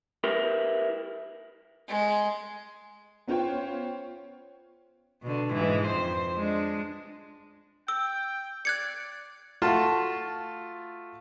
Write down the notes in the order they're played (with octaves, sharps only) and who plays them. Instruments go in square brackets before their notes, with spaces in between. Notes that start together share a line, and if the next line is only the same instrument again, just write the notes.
[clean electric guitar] E4 G4 A#4 B4
[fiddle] G#3
[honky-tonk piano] B3 C#4 F4 C5 C#5 G5
[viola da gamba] B2 D3
G#2 E3
F2 C5
G#3 D4
[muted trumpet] G5 [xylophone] E6
[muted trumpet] D5 [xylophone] F#6 G#6 C#7
[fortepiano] A3 F4 F#4 A5 C6 F6